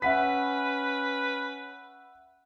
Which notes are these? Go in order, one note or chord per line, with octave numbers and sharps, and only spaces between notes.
C#4 B4 E5 F#5 B6